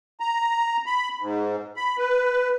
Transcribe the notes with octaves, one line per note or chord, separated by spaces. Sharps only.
A#5
B5
G#2
B5
B4